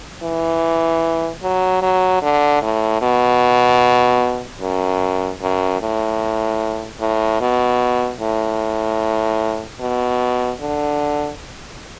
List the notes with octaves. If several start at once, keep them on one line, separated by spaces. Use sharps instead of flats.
E3
F#3
F#3
D3
A2
B2
F#2
F#2
A2
A2
B2
A2
B2
D3